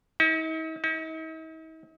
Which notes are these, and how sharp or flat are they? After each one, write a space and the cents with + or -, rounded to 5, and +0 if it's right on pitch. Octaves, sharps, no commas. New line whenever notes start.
D#4 +45
D#4 +45